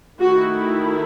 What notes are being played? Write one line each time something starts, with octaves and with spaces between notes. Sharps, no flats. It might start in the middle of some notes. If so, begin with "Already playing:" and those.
D#3 A3 E4 F#4